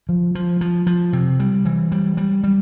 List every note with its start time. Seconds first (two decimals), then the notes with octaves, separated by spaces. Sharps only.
0.09 F3
0.35 F3
0.61 F3
0.87 F3
1.13 C3
1.40 G3
1.65 E3
1.92 G3
2.17 G3
2.44 G3